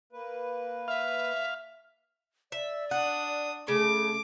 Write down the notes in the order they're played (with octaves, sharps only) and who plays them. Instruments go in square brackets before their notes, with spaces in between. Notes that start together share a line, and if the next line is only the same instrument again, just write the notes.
[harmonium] A#3 B4
[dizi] E5 [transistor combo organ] F5
[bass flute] D5 [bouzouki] E5
[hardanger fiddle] D4 D#6 [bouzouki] F#5
[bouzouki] C#3 [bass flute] A3 [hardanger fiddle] D6